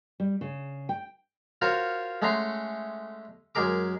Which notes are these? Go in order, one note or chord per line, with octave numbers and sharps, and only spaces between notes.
G3
C#3
G5
F4 F#4 A#4 C5 C#5
G#3 A3 C#4 F#5 A#5 C6
F#2 G#3 G#4 A#4 D6